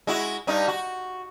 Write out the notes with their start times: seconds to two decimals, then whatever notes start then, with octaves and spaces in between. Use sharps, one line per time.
0.07 G#3 E4 F#4
0.47 G2 G3 D#4
0.68 F#4